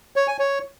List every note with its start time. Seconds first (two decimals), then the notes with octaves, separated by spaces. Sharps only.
0.16 C#5
0.28 G#5
0.39 C#5